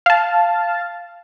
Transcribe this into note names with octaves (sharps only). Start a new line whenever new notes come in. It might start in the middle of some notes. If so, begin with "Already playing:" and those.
F5 A5